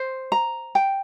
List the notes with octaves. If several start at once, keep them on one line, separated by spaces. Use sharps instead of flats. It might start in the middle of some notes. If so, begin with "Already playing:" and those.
Already playing: C5
A#5
G5